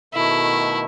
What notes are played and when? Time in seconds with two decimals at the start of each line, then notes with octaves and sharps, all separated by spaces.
0.14 B2 D#3 A3 E4